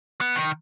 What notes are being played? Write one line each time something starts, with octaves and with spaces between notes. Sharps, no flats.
B3
D#3